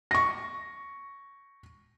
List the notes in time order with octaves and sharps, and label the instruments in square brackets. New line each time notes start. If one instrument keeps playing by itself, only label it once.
[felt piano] C#6 A#6